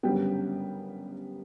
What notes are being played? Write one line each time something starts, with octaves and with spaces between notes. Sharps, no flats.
G1 F#2 C#3 G3 B3 G5